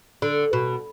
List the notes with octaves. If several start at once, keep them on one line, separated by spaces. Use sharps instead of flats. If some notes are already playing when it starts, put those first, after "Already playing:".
D3
B2